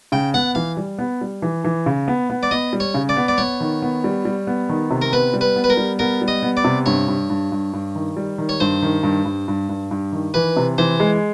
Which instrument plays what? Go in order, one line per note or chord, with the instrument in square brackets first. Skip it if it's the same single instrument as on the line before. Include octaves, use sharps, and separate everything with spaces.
[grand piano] C#3 [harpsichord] G5
[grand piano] B3 [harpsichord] F#5
[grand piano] E3 [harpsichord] F5
[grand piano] G3
B3
G3
E3
E3
C#3
B3
B3
[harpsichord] D5
[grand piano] B3 [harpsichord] D#5
[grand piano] G3
[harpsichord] C#5
[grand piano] C#3
[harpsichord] D5
[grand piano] B3
[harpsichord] D5
[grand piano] B3 [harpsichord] C#5
[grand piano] D#3
B3
G3
G3
B3
D#3
C3
[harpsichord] A#4
[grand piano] B3 [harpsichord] B4
[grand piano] G3
[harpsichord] B4
[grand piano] B3
[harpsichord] B4
A#4
[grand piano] G3
[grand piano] B3 [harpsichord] A#4
[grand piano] G3
[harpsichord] D#5
[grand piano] B3
[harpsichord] D5
[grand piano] C3
[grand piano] G2 [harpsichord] C#5
[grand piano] G2
G2
G2
G2
D#3
G3
D#3
[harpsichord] C#5
[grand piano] G2 [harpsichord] C5
[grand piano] D#3
G2
G2
G2
G2
G2
D#3
[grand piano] E3 [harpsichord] B4
[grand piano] C3
[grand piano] E3 [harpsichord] C5
[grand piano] G#3